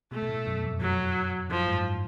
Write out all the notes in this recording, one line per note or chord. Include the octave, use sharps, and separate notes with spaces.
B2 A3
B2
A2
F#2
F2
F2 F#3
F#2 F3
G#2
A2